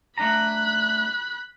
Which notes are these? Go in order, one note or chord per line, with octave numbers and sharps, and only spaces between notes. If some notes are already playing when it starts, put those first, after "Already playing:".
A3 D4 A#5 B5 F#6